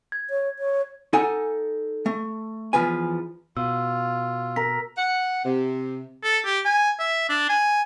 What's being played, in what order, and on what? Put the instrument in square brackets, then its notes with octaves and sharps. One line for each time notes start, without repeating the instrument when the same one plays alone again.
[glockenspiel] G#6
[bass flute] C#5
C#5
[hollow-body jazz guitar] D#4 A4 F#5 G#5
A3
E2 F3 B4 G#5
[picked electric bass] B2 [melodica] F4 [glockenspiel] E6
[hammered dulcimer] A#4 [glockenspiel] B6
[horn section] F#5
C3
[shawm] A4
G4
G#5
E5
D4
G#5